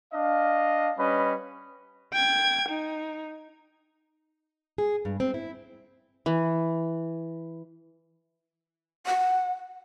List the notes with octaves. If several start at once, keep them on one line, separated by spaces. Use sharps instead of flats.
D4 D#5 F5
G3 C#4 B4 D#5 B5
G5 G#6
D#4
G#4
G2
C4
E4
E3
F#5